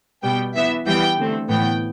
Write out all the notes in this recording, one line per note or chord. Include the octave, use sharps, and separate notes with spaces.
B2 G3 B3 G5
E3 B3 E5
E3 G3 B3 G5
D3 A3 C4
A2 E3 B3 G5